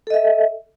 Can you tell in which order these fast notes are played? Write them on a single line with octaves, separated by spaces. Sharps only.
A4 D#5 E5